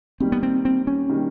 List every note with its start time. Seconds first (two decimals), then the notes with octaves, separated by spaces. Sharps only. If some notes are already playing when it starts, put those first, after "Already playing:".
0.20 D#3 G3 A#3 C4
0.32 B3
0.43 C4
0.65 C4
0.87 C#4
1.10 D#3 G3 A#3